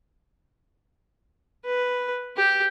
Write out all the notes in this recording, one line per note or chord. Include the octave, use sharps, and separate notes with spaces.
B4
G4